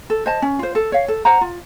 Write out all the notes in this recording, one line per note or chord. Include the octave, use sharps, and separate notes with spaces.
A4
C5 D#5 A5
C#4
F4 C5
A4
C#5 F5
A4
C5 F#5 A#5
F4